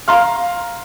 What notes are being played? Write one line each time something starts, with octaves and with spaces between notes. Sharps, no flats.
F5 A#5 C6 F6